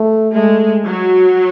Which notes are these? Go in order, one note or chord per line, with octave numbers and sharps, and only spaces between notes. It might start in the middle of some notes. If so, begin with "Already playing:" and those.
Already playing: A3
G#3 A3
F#3